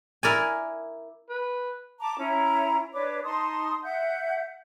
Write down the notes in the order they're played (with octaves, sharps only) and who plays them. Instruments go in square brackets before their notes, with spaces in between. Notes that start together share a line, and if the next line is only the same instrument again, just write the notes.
[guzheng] E4 A#4 D5 G#5
[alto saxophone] B4
[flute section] A5 A#5 D6
C#4 E4 A#5
D4 B4 C#5 D6
D#4 A5 C6 D#6
E5 F#5 G6